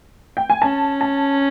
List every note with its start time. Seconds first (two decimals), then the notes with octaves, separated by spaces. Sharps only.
0.37 G5
0.50 G#5
0.62 C#4 A5
1.01 A5